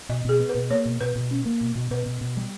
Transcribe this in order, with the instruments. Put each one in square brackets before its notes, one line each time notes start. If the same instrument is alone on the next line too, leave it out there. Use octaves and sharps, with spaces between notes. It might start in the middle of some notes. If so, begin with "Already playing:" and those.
[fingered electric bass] B2 [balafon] D#5
[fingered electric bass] B2 [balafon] G#4
[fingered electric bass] B3
[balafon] B4
[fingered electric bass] B2
[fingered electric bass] A#3 [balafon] C#5
[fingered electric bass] B2
[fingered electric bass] B2 [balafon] B4
[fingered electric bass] B2
C#4
A#3
B2
B2
[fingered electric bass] B2 [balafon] B4
[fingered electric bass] B2
B2
G3